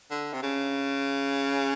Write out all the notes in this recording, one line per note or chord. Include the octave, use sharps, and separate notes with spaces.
D3
C3
C#3